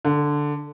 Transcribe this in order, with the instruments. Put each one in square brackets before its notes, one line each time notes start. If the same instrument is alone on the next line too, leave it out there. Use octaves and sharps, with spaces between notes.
[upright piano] D3